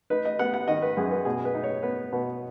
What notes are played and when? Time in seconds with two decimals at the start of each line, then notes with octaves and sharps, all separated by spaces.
0.10 D#4 B4
0.25 D#5
0.39 B3 F#5
0.54 F#5
0.68 D#3 D#5
0.82 B4
0.97 F#2 G#4
1.11 B4
1.25 B2 G#4
1.45 B4
1.55 D#4
1.64 C#5
1.83 B3 B4
2.12 B2 B4